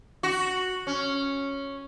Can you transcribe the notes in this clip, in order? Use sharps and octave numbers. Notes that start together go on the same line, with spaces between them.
F#4
C#4